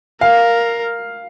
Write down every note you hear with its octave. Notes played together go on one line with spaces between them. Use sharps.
A#4 F5